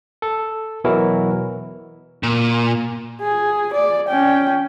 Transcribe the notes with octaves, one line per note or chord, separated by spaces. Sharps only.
A4
B2 E3 F#3 E4 F#4 A#4
A#2
G#4
D5
C#4 G5